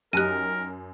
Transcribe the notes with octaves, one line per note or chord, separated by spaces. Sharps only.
F#2 D#4 G4 A#4 G5 F#6 D#7